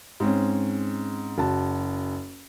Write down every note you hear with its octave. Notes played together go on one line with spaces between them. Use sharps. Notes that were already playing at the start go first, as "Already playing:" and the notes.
G#2 C4 C#4
F#1 F#4 A5